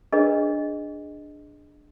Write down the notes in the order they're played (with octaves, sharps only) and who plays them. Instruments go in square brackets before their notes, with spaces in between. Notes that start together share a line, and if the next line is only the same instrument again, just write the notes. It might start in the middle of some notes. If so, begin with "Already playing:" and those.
[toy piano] D4 G#4 B4 C#5 D#5